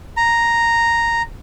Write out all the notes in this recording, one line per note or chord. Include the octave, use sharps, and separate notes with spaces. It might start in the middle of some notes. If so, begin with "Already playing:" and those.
A#5